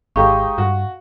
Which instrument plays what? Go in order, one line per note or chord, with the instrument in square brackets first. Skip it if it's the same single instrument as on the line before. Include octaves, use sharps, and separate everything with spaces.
[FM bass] G#1 [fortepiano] G#3 D#4 G4 [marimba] F5 [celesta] C#6
[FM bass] G2 [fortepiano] F#4